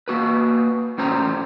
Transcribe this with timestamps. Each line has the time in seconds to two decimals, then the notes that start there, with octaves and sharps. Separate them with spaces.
0.08 A#3 F#4 B4
0.98 A2 C#4 C5 A#5